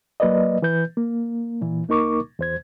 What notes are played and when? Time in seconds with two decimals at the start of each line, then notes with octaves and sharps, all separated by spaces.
0.20 F#3 A#3 B4 D5 D#5
0.62 E3 B4 G6
0.97 A#3
1.61 A#2 E3
1.88 C#2 A#3 D#4 A#4 C#6 D6
2.39 E2 C5 G#6